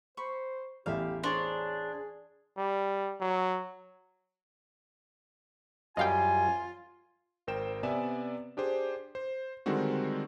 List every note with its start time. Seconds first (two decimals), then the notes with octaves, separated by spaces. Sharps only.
0.17 C5 B5 C#6
0.86 A1 E2 G4 E5 F5
1.24 D4 G#4 C5 C#5 A#5
2.57 G3
3.20 F#3
5.97 F#2 G3 F4 D#5 F5 G5 G#5
7.47 G#1 A#4 C5 G5 E7
7.83 C3 B3 D5 E5 G#5 E7
8.57 D4 G4 G#4 C5
9.15 C5
9.66 D3 D#3 G3 G#3 C4 F#4